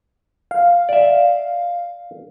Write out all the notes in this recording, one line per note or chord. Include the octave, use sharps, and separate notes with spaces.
F5
D5 E5